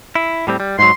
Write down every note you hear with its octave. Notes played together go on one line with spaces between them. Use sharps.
E4
A2 G3 C4
G3
G#2 F#3 C6